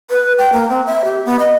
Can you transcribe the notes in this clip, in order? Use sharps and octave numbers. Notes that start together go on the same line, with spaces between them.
B4
G5
A#3
C4
E5
G4
B3
D#5